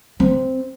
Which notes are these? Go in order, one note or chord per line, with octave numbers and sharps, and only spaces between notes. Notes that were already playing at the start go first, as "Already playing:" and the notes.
C4